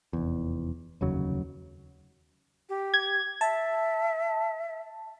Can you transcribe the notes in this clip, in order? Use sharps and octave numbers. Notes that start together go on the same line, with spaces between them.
F1 E2
F1 D#2 C#3 F#3
G4
G#6
E5 A5